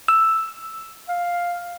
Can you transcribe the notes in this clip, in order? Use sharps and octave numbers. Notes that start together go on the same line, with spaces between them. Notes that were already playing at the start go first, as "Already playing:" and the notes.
E6
F5